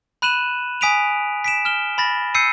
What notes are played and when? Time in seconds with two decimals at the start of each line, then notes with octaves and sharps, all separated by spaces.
0.22 B5 F#6 D#7 E7 F#7
0.81 G#5 D#6 B6 D7 D#7 F7
1.44 B6 D7 E7
1.65 F6 E7 G7
1.98 B5 A6 A#6
2.34 E6 G6 C7 C#7 D#7